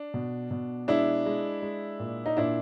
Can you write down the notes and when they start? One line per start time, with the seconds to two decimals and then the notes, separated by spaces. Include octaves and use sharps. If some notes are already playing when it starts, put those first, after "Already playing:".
Already playing: D4
0.14 B2
0.51 B2
0.88 G#3 D4 E4
1.26 G#3
1.62 G#3
2.00 A#2
2.26 D#4
2.37 A#2 D4 E4